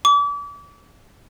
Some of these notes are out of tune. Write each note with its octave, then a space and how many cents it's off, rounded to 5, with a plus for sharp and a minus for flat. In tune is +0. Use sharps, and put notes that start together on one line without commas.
D6 -35